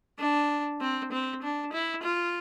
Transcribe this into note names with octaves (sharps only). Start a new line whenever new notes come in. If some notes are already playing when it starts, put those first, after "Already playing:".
D4
C4
C4
D4
E4
F4